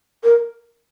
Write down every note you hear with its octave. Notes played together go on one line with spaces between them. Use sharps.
A#4